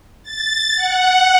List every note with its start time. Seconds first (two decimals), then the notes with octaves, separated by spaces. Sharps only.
0.23 A6
0.76 F#5